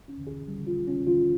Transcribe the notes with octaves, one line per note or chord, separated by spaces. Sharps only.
C#4
G#4
G3
F4
C#4
F4